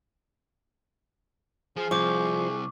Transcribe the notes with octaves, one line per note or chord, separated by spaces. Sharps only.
F3 G#4
C2 F3 C#6 D6